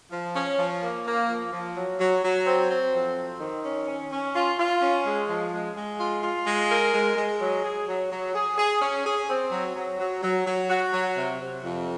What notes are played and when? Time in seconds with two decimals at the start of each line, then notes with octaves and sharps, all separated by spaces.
0.11 F3
0.35 C#4
0.59 F3
0.81 A#3
1.05 A#3
1.28 F3
1.52 F3
1.76 F#3
1.99 F#3
2.23 F#3
2.47 C4
2.70 C4
2.94 F2
3.17 C4
3.40 D#3
3.64 C#4
3.87 C#4
4.11 C#4
4.35 F4
4.58 F4
4.81 C#4
5.06 G#3
5.28 F3
5.52 G#3
5.76 G#3
5.99 F4
6.23 F4
6.47 G#3
6.70 A#4
6.94 G#3
7.16 G#3
7.40 F#3
7.64 G#4
7.88 F#3
8.11 F#3
8.34 G#4
8.57 G#4
8.81 C#4
9.05 G#4
9.29 C4
9.51 F#3
9.75 F#3
9.99 F#3
10.22 F#3
10.46 F#3
10.69 F#4
10.92 F#3
11.16 C3
11.40 C3
11.64 F2